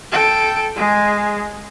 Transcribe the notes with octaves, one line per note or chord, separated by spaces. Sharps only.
A4 G5
G#3 G#4